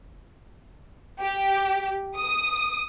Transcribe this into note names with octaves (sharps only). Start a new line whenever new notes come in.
G4
D#6